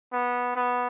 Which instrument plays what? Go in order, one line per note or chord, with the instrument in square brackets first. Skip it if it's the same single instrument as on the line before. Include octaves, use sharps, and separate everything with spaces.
[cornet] B3
B3